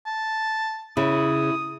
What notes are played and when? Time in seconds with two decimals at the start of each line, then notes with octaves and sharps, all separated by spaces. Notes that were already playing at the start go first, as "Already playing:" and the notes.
0.06 A5
0.97 C#3 E4 D#6